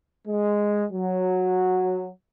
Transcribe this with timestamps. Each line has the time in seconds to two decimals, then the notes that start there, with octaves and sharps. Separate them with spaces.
0.27 G#3
0.93 F#3